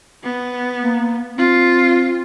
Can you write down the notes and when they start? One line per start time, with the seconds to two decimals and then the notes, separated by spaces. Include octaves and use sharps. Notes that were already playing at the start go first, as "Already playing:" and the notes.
0.23 B3
0.83 A#3
1.38 C4 F4